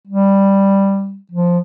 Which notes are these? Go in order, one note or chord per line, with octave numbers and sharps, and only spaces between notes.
G3
F3